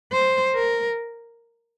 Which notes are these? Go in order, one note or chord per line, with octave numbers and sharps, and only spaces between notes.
C5
A#4